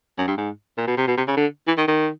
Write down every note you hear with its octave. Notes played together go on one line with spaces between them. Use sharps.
F#2
G2
G#2
A#2
B2
C3
B2
C3
C#3
D3
E3
D#3
D#3